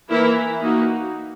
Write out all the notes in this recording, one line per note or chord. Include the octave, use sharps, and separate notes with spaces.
E3 A#3 E4 A#4
A#3 D#4 F#4